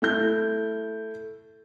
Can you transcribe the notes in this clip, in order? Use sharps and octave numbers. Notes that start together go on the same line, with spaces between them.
A3 E4 G6